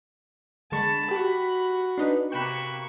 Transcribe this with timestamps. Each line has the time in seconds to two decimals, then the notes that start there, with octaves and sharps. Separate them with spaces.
0.72 D3 G#3 A5 B5 C#6
1.11 F#4 G4
1.98 D4 D#4 B4
2.32 C3 A#3 G5 B5 C#6 F#6 E7